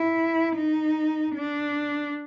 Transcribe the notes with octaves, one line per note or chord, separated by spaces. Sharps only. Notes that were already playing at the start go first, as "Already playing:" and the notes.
Already playing: E4
D#4
D4